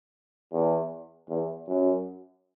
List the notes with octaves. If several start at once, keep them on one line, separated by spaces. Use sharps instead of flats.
E2
E2
F#2